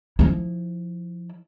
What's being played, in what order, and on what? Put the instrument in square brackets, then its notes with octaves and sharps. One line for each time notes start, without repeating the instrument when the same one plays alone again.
[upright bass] F3 E4